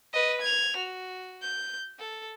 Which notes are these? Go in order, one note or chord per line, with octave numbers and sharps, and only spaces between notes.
B4 D#5
G#6 F7
F#4
G6
A4